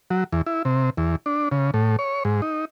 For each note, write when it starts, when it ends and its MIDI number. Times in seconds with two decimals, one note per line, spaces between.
0.10 0.24 54
0.32 0.42 40
0.46 0.63 64
0.65 0.90 48
0.97 1.16 40
1.26 1.49 62
1.52 1.71 49
1.74 1.96 45
1.99 2.23 73
2.25 2.41 44
2.42 2.65 63